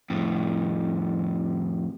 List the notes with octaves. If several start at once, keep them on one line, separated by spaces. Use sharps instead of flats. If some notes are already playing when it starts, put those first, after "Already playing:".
F2 A2